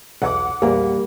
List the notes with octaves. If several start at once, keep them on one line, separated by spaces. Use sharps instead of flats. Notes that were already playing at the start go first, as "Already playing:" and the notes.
B1 E2 F#3 F#5 D6
A#1 E2 A#2 G3 A#3